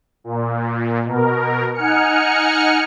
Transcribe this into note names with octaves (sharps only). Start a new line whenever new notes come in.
A#2
B2 A#4
D#4 F#5 G#5 F6 C#7